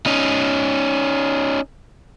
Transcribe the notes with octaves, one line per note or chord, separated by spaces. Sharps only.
C#4 D#4